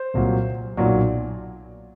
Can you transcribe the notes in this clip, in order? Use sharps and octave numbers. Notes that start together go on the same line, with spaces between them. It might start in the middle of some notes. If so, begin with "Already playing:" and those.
Already playing: C5
C2 A#2 F#3
B1 A#2 F#3 D5